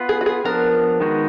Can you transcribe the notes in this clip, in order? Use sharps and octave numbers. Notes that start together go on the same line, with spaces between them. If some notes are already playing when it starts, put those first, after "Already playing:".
Already playing: B3 F4 B4
G#4
F#4
G#4
F3 B3 D4 A#4
D#3 G#3 B3 D#4 F#4